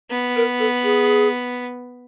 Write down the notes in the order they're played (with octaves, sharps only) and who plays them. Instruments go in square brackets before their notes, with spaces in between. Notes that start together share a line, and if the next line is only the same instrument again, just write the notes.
[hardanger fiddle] B3
[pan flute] A#4
A4
G#4